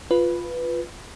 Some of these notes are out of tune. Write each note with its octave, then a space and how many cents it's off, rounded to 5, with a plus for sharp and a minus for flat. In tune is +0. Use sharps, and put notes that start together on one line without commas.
F4 +0 B4 +0